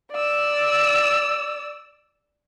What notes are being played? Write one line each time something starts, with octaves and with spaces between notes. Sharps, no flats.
D5 E6